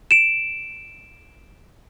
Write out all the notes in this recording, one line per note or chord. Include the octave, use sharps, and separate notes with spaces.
D7 E7